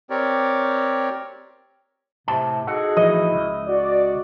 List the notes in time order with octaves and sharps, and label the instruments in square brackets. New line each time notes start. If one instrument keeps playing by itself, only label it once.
[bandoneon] C4 G4 A#4 C#5 D5
[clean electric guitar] A2 A5 [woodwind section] C3
[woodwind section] D#4 F#4 G#4 [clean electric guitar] A4 F#5
[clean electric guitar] A2 E3 F3 [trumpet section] E4 [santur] D#5
[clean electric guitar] C#2
[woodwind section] F#4 [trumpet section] D5